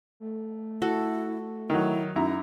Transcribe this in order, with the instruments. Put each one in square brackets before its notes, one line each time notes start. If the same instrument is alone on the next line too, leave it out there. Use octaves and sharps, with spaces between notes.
[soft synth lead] A3
[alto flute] E4 [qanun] F#4 A4
[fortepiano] D#3 F#3 [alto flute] E4
[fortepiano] F#2 E4 A#5 [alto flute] D#4